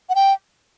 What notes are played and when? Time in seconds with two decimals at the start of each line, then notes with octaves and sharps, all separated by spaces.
0.09 F#5
0.15 G5